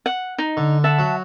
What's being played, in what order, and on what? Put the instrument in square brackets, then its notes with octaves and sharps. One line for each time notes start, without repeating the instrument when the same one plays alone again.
[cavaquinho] F#5
D#4
[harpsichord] D3
[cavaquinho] E5 F#5 A5
[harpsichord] F#3